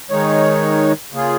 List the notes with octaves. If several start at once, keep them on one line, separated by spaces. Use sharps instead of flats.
D#3 G#3 D#4 C#5
C#3 A#3 F4 G#4